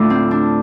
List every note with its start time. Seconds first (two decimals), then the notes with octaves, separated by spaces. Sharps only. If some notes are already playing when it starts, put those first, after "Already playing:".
Already playing: D2 A2 A3 D4 F4
0.10 C4
0.31 D4